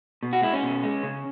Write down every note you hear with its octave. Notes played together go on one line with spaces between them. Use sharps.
B2
F#4
G#3 E4
C#4
B2
G#3
C#3